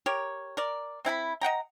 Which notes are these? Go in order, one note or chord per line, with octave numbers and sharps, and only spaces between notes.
G4 A#4 C#5
A#4 D5
C4 E4 G5 B5
D#5 F#5 G5 A#5